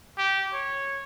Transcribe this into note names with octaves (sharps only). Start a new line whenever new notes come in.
G4
C#5